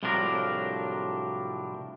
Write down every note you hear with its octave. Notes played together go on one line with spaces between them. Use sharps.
C2 A2 F3 F#3 D4 A#4